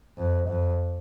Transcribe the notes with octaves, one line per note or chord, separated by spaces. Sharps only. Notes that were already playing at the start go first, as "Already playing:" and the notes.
F2
F2